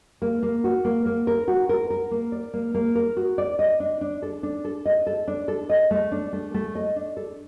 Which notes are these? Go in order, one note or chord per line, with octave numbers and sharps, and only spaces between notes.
A#3
A#3
F#4
A#3
A#3
A#4
F#4
A#4
A#4
A#3
D5
A#3
A#3
A#4
F#4
D5
D#5
D4
D4
A4
D4
A4
D#5
A4
D4
A4
D#5
A3
D4
A3
A3
D#5
D4
A4